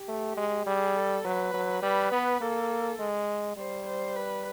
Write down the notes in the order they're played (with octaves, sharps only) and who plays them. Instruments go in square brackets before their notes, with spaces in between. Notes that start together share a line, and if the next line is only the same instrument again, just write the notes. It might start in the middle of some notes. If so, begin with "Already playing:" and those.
Already playing: [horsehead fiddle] G4
[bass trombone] A3
G#3
[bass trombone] G3 [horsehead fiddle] G#4
[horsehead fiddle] A4
[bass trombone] F#3 [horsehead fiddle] B4
[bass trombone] F#3
[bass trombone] G3 [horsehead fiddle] B4
[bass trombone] B3
[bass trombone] A#3 [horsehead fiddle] A4
[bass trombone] G#3
[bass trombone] G3 [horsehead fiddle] C5
[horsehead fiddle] C5
B4